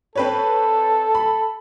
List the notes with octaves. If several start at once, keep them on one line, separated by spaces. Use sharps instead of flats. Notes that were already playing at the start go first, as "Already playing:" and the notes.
C4 A4 B4 C#5
B5